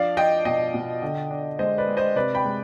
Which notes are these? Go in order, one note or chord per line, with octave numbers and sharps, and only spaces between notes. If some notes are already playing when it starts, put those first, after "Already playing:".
Already playing: F3 D4 D5 F5
D4 D#5 G5
B2 D#5 G5
B2
D3
D4
G#3 C5 D#5
B4 D5
G#3
C5 D#5
C3 B4 D5
G5 B5
G#3